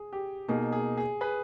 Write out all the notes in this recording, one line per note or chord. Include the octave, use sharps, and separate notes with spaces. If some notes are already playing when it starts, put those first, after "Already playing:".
Already playing: G#4
G4
B2 A#3 D#4 G#4
G#4
G#4
G#4 B4